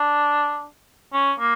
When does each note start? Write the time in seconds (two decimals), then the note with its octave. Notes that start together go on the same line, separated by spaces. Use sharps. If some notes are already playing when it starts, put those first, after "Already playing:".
Already playing: D4
1.13 C#4
1.40 A#3